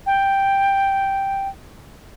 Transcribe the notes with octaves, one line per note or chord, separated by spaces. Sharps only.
G5